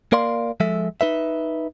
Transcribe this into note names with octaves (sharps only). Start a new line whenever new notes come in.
A#3 A#4 D5 F5 C6
F3 G#3 A4 E5
D#4 B4 E5